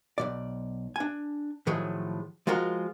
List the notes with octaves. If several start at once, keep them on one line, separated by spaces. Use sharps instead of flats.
B1 B2 D5
D4 G#5
A2 D#3 F3 F#3 G#4
F3 G#3 F4 F#4 A#4